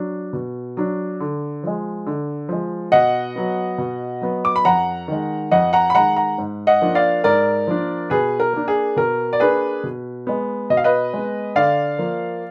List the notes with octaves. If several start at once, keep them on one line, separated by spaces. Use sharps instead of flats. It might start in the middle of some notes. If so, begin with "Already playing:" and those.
Already playing: F#3 D4
B2
F#3 D4
D3
F3 G#3
D3
F3 G#3
B2 D#5 F#5
F#3 B3
B2
F#3 B3
D6
B5
F2 F#5 A#5
D#3 G#3
F2 D#5 F#5
F#5 A#5
B5
D#3 G#3 F#5 A#5
F#5 A#5
G#2
D#5 F#5
F3 A#3 D4
D5 F5
G#2 A#4 D5
F3 A#3 D4
B2 G#4 B4
A#4
A#3 D4
G#4
B2 A#4
D5
A#3 D4 G#4 B4
B2
G#3 B3
B2 D#5
F5
B4 D#5
G#3 B3
D3 D5 F5
F3 A#3